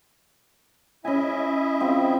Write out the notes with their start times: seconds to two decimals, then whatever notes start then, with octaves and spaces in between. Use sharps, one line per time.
1.05 C#4 E4 D#5 E5 G#5
1.80 F3 C4 F4